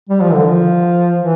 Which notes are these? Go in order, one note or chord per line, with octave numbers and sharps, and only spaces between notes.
G3
F3
D3
F3
E3